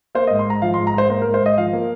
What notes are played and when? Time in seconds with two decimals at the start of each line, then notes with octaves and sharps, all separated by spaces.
0.15 A#3 C5
0.27 G#2 D#5
0.39 C6
0.46 G#2 A#5
0.62 F3 F5
0.74 C6
0.78 G#2
0.87 A#5
0.94 G#2 C5
1.10 A#3 C5
1.22 A#4
1.26 G#2
1.34 C5
1.41 G#2 D#5
1.58 F3 F5
1.73 A#3